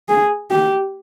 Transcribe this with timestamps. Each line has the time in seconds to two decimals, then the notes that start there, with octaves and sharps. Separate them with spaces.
0.09 G#4
0.51 G4